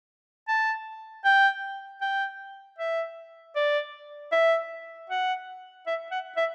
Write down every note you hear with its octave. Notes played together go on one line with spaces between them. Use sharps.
A5
G5
G5
E5
D5
E5
F#5
E5
F#5
E5